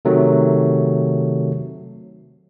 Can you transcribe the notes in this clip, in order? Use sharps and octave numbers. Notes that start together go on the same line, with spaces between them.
C3 D#3 F#3 A3